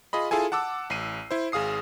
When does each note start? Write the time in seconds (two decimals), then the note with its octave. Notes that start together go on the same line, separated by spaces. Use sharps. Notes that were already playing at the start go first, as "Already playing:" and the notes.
0.13 F4 G#4 D#5 B5
0.31 E4 F4 G#4 A4 G#5
0.52 F#5 A5 D6 E6
0.90 A1 C7 D#7
1.31 E4 C5
1.52 G#1 G#4 F5 D#6 C7